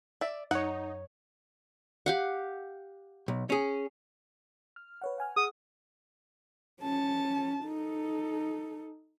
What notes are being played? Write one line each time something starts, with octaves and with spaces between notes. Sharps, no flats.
D5 E5
F#2 D#4 C#5 F#5
G4 F5 F#5
B1
C#4 G#4
F6
B4 C#5 F#5
F#5 G#5 F6
G#4 F#5 D#6
C#4 A5
D#4 A4